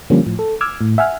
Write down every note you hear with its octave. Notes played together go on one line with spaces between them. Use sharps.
D3 F3 G3 A#3 C#4
A2 F3
A4
D6 E6 F6 G#6
A2
E5 F#5 G#5 F6